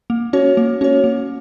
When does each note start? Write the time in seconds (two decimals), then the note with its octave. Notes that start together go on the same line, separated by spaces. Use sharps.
0.10 A#3
0.33 C#4 F#4 C#5
0.57 A#3
0.81 C#4 F#4 C#5
1.04 A#3